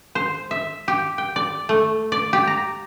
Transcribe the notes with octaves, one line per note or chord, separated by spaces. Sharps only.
C5
E5
G4
G5
D5
A3
D5
G4
A#5